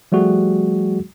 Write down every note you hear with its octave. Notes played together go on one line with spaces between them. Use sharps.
F3 G3 A3 F#4 G#4